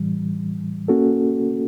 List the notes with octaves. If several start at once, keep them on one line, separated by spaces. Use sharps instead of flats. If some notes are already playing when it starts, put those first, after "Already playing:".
Already playing: A2 E3 G3
A#3 C#4 F#4 A4